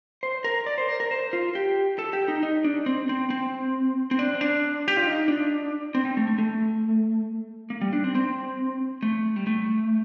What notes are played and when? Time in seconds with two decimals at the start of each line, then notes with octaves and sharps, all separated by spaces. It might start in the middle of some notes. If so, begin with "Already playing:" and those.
0.23 C5
0.44 A#4
0.66 D5
0.78 C5
0.88 A#4
1.00 A#4
1.11 C5
1.33 F4
1.55 G4
1.99 A4
2.13 G4
2.28 D#4
2.43 D#4
2.64 D4
2.86 C4
3.09 C4
3.30 C4
4.11 C4
4.19 D4
4.35 C4
4.41 D4
4.88 G4
4.97 F4
5.07 D#4
5.28 D4
5.95 C4
6.05 C4
6.17 A3
6.28 A3
6.38 A3
7.70 A#3
7.81 G3
7.93 D4
8.04 C4
8.15 C4
9.03 A3
9.36 G3
9.47 A3